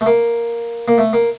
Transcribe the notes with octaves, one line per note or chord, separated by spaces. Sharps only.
A3
A#3
A#3
A3
A#3